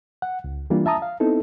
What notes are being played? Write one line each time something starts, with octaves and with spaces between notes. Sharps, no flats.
F#5
C#2
E3 G3 A#3 D4 F4
E5 A5 A#5 D#6
F5
B3 C4 D#4 E4 A4